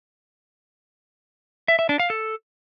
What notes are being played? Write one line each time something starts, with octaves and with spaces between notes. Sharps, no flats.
E5
E5
D4
F5
A4